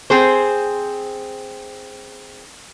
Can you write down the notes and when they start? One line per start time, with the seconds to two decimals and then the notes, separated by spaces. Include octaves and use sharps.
0.10 C4 G#4 C5